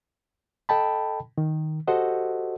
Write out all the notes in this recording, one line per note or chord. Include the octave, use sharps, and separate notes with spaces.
A4 D#5 G5 A5 B5
D#3
F#4 G4 A4 C5 D#5 F#5